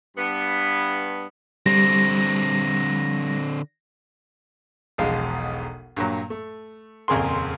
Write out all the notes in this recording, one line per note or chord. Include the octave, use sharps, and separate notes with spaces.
G2 B3
D3 G3 C4 A#6
E1 B1 F3 G#3 F5
G2 A#2 F#3
A3
D#1 F2 C#3 G#4 A#4 C6